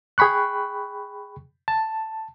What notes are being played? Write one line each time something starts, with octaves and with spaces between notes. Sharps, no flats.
G#4 G5 B5 C#6 F#6
A5